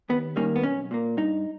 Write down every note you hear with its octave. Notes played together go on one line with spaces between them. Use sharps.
D#2 B3
D#3 G3 A#3 C#4
B3
B1 C#4
A#2 A#3
G2 D#4